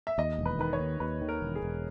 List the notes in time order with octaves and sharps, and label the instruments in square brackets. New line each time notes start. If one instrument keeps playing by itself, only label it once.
[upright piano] E5
[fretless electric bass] D#2 [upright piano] D#5
[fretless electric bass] E1
[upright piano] B4
[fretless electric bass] D#3 [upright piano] B4
[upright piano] C#5
[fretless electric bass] D#2
[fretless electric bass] D#2 [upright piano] B4
[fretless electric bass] D#3
[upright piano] A#4
[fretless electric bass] E1
[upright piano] G#4
[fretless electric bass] E1